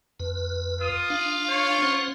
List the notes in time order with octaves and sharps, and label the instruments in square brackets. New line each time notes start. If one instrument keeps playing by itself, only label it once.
[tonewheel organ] F2 B4
[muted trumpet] F4 [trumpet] D#6
[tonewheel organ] D4 F5
[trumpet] C#5
[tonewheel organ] C#4 C5 F#5